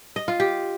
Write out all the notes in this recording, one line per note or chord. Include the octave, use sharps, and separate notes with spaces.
D#5
F4
G4